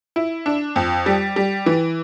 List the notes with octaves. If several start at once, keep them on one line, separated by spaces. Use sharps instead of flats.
E4
D4
F2
G3
G3
E3